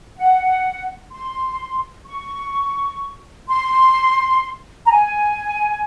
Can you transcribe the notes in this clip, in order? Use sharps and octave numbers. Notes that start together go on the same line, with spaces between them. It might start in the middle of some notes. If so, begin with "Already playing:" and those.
F#5
C6
C#6
C6
A#5
G#5